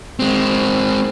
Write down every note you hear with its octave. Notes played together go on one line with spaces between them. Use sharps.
G#3 C4